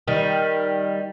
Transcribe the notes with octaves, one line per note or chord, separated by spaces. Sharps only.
D#3 G3